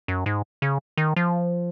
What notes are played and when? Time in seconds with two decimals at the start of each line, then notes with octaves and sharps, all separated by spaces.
0.08 F#2
0.26 G#2
0.62 C#3
0.97 D#3
1.16 F3